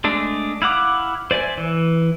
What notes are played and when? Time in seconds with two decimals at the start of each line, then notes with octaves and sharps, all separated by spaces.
0.04 G#3 A3 D4
0.62 E4 F5 F#5 D6
1.31 C5 D5 E5 G#5
1.58 E3